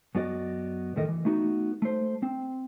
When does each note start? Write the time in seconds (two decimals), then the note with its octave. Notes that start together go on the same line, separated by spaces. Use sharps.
0.15 F#2 B3 F#4 D5 D#5
0.96 E2 A2 D#3 A4 A#4 D#5
1.09 E3
1.25 A3 B3 D#4 F#4
1.82 A3 C5
2.23 C4